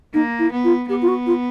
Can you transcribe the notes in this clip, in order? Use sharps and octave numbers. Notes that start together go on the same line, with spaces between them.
A#3 D#4
E4
B3
F4
B3 G4
F4
F#4
F4